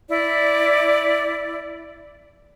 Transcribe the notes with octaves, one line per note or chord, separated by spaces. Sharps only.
E4 D5